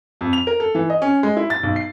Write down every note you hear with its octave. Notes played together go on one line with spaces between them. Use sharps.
F2
F7
A#4
A4
E3
D#5
C#4
G#3
E4
A6
B1
C7